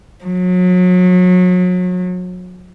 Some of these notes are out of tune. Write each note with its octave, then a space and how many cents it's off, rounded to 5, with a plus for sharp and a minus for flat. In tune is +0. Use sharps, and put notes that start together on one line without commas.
F#3 -35